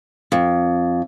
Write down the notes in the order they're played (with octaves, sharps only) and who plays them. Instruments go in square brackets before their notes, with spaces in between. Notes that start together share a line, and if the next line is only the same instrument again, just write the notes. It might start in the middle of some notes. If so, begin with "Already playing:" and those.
[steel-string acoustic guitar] F2